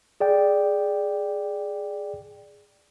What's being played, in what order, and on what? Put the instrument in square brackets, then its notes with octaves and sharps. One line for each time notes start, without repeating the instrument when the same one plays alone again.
[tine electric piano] G#4 D5 G5